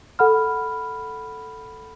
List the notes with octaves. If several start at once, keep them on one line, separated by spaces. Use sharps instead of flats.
A4 F#5 B5 F6